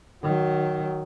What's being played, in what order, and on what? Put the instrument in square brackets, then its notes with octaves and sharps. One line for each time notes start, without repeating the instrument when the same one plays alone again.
[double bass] D#3 F#3